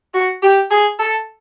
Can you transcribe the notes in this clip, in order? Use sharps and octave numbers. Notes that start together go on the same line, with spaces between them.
F#4
G4
G#4
A4